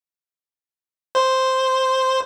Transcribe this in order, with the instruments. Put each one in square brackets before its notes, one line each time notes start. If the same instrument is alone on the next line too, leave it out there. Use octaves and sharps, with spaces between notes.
[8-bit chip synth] C5